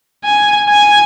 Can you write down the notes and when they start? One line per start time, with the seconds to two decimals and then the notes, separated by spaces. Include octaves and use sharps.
0.25 G#5
0.69 G#5